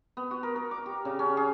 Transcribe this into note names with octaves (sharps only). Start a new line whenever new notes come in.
B3
F#4
A#4
A#4
D6
G4
C#3
C#4
G#4